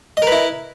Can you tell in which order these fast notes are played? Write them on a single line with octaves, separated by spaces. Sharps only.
D#5 A#4 B4 E4